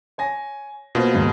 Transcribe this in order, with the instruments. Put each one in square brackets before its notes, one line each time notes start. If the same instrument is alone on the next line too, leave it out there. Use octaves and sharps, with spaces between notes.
[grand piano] C#5 G#5 A#6
[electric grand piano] B2 F4 [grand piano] A#3 C5
[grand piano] D#2 G#2 D#3